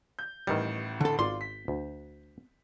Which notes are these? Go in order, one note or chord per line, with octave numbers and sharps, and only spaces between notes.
G6
A1 A2 D#3 E3 G3
D3 A4
G#1 F4 D5 C6
B6
D2